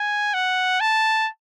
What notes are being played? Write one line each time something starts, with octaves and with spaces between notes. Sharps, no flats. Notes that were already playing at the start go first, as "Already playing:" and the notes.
Already playing: G#5
F#5
A5